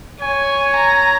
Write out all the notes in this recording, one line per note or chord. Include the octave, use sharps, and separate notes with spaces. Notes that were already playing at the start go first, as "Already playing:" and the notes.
C#5 G#5
A#5